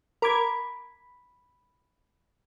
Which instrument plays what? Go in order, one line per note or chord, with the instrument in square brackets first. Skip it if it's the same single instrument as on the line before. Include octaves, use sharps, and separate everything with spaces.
[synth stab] A#4 D6 G#6 [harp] B5